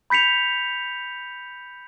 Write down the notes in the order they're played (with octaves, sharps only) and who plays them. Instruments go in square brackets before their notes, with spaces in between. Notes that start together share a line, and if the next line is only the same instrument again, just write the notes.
[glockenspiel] B5 G6 B6 C#7 F7